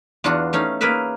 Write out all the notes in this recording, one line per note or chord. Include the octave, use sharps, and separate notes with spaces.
E2 D4 F4 F#4
A3 C#4 D#4 F5
A#3 C#4 G#4 A#4 B4 E5